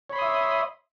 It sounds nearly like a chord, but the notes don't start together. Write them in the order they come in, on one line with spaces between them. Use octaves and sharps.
C#5 B5 C6 D#6 E5